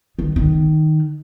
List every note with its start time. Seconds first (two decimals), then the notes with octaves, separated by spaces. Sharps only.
0.19 D#3
0.36 D#3